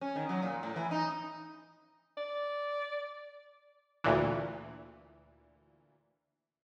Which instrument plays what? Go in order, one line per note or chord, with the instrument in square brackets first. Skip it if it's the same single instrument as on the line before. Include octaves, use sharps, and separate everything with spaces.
[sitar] C#4
D#3
F#3
A#2
A2
E3
D#4
[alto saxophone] D5
[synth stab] D2 A#2 E3